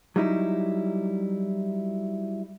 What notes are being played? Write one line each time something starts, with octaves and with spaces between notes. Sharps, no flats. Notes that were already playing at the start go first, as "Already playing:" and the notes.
F#3 G3 D#4 E4